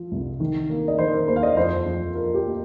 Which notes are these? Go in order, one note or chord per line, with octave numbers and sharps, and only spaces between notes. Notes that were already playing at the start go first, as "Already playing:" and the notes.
Already playing: F3
C2
D#3
A#3
D#5
D#3 C5
A#4
D#2 C5
F5
D#5
F2 C5
F2
F3 A#4
G4
A#3